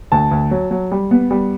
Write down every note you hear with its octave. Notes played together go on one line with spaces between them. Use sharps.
D2 A5
D2
F#3
F#3
G3
B3
G3